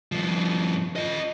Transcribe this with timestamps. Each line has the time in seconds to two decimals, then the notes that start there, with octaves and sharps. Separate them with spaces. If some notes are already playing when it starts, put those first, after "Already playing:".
0.12 G2 F3
0.96 F4 D#5